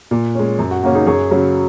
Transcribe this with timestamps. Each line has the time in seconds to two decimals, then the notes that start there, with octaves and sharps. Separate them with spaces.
0.11 A#2
0.35 G#3 C#4
0.59 F#2
0.71 F#4
0.83 C#3 A#3 C#4 F#4
0.94 D#4 G#4
1.06 F#2 G#4 C#5
1.31 C#3 F#3 C#4